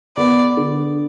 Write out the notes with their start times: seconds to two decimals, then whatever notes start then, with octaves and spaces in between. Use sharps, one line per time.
0.17 B3 D5
0.57 D3